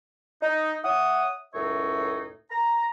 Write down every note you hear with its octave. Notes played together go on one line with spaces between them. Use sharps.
D#4
C#5 E5 F#5 D#6
C#2 F#2 A2 D#4 C#5 E5
A#5